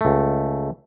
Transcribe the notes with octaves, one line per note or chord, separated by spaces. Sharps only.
C#2 A3